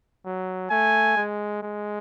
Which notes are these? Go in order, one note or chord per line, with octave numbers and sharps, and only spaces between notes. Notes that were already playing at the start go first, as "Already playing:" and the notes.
F#3
A3 G#5
G#3
G#3